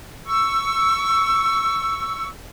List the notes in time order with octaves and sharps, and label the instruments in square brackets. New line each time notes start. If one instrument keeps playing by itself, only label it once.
[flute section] C#6 E6